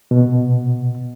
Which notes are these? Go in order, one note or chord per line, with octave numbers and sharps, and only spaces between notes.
B2